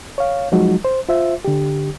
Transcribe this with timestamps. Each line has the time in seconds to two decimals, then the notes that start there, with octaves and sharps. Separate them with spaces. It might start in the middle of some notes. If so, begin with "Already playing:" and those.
0.18 C#5 F5
0.52 F3 F#3 G#3 D#4 F#4
0.85 C5
1.09 F4 C5 E5
1.45 D3 G4